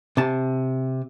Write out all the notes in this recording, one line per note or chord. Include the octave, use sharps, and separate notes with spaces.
C3 A5